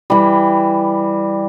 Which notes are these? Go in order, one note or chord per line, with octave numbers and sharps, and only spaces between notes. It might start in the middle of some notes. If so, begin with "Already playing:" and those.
E3 G3